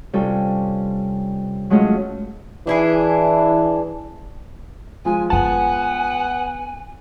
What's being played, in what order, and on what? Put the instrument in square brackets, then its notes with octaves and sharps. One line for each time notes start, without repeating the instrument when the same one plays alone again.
[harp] C3 G3 C#4 F4 A4
F#3 G#3 A3 C#4 F4
[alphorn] E3 [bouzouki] D4 E4 G#4
[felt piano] F3 G#3 [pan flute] G#5
[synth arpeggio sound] G1 A5 [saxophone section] B3 F#5 [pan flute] G#5